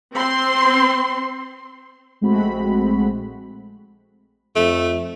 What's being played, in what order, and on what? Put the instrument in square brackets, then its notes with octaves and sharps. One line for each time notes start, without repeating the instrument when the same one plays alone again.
[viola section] C4 C6
[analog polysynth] A#1 G#3 A3 C4 F#4 B5
[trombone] F2 [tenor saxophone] A3